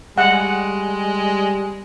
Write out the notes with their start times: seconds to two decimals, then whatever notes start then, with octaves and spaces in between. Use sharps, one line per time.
0.18 G3 G#3 F#5